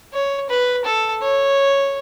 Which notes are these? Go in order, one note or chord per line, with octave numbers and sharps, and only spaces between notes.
C#5
B4
A4
C#5